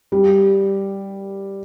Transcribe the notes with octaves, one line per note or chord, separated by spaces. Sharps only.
G3